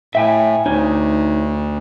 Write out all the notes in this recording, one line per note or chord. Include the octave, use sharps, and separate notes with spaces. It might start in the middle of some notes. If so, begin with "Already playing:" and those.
A2 E5 G5 G#5
D2 D#4 C#5